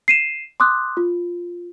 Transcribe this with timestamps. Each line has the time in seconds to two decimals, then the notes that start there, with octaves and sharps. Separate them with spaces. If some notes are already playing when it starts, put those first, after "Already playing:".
0.08 C7 D#7 E7
0.60 C6 D6 D#6 F#6
0.97 F4